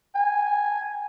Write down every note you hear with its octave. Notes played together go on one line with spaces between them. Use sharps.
G#5